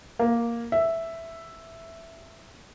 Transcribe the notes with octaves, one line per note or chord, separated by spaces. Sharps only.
A#3
E5